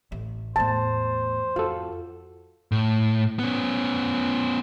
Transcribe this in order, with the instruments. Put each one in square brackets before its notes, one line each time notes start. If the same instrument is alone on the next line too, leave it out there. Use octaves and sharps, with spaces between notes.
[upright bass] A1
[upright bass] E2 A2 [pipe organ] C5 [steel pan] A5
[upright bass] F2 [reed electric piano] F4 F#4 A4
[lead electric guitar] A2
B3 C#4